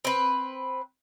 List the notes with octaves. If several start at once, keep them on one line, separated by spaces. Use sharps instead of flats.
C4 B4